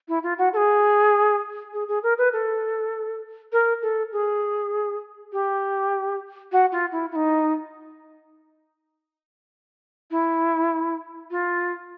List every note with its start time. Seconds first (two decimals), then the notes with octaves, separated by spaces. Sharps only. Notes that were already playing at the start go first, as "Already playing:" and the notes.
0.08 E4
0.23 F4
0.38 F#4
0.53 A4
0.56 G#4
1.73 G#4
1.88 G#4
2.03 A#4
2.18 B4
2.33 A4
3.52 A#4
3.82 A4
4.12 G#4
5.32 G4
6.52 F#4
6.72 F4
6.92 E4
7.11 E4
7.15 D#4
10.11 E4
11.31 F4